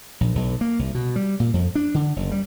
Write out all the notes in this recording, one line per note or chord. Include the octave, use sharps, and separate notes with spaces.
A#1
B1
A#3
C2
B2
G3
A#2
F2
D4
D3
F#1
G3